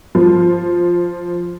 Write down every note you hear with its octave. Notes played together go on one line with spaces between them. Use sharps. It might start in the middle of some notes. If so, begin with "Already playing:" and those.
F3